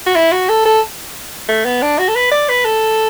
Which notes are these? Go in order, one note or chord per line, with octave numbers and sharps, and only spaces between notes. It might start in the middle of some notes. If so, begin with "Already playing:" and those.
F#4
E4
F#4
A4
A4
A3
B3
D4
F#4
A4
B4
D5
B4
A4